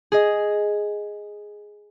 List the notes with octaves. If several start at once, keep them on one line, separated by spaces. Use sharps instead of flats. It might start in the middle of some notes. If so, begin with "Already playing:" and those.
G#4 D#5